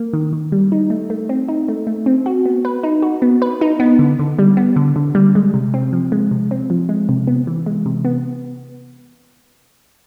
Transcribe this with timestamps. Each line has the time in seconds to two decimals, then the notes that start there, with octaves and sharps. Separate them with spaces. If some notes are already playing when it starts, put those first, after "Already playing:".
Already playing: A#3
0.13 D#3
0.33 D#3
0.52 G3
0.72 D#4
0.90 A3
1.10 A3
1.29 C4
1.48 D#4
1.68 A3
1.87 A3
2.06 C4
2.26 F#4
2.46 B3
2.65 B4
2.83 D#4
3.02 F#4
3.22 B3
3.42 B4
3.61 D#4
3.80 B3
3.99 D3
4.19 D3
4.39 G3
4.57 B3
4.76 D3
4.96 D3
5.15 G3
5.35 G#3
5.54 C3
5.74 C4
5.93 F3
6.12 G#3
6.31 C3
6.51 C4
6.70 F3
6.89 G#3
7.09 C3
7.27 B3
7.47 E3
7.66 G#3
7.86 C3
8.05 B3